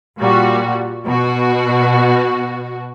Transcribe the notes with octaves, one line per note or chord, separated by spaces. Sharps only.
A#2 G3 F#4
B2 F#4